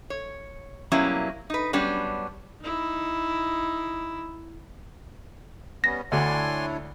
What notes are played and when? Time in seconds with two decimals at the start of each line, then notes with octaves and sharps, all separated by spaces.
0.10 C#5
0.92 B2 F#3 G3 A#3 C#4 E4
1.50 D#4 B4
1.73 F#3 G3 B3 C#4 D4
2.61 D#4 E4
5.84 G3 B3 C#4 A#6
6.12 D2 D4 E4 C#5 D5 G#5 C6